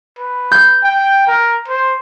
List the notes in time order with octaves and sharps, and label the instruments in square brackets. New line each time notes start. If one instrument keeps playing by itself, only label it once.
[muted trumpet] B4
[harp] G6
[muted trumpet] G5
A#4
C5